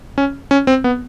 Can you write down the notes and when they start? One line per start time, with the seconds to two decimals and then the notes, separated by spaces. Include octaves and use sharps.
0.18 C#4
0.51 C#4
0.67 C4
0.84 B3